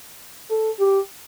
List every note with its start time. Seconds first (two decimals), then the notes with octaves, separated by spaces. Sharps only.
0.50 A4
0.79 G4